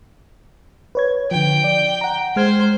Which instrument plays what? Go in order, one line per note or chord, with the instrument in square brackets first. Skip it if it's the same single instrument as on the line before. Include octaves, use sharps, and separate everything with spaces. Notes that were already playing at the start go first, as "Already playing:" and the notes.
[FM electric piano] B4 C#5 G#6
[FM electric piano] D3 F3 [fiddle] G5
[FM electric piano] D5
F#5 A#5
[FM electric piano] G#3 F6 G#6 [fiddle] C5